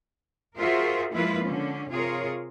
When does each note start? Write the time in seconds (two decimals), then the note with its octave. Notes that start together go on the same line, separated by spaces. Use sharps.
0.59 F4 F#4 G#4 A#4 C5 E5
1.13 F3 G#3 A#3 E4 F4 B4
1.48 D3 C#4
1.90 C3 F4 G#4 A#4 C#5